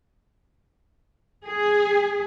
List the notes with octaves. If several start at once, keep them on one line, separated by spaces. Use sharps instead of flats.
G#4